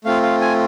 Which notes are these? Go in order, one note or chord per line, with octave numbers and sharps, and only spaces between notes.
A3 C4 F4 F5
F5
G#5